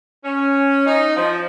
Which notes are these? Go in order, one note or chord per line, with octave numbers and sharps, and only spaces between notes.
C#4
D#4
F3